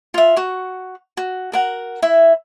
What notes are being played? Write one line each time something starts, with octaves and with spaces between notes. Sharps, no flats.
F4 E5
F#4 C#6
F#4
F#4 A#4 F#5
E4 E5